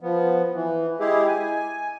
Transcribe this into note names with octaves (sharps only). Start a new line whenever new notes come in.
F3 B3
E3
G#3 E4 G4 G#4
G#5